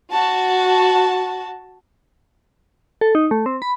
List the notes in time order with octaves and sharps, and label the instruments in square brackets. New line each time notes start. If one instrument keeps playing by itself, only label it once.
[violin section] F#4 A5
[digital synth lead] A4
D#4
A3
C4
B5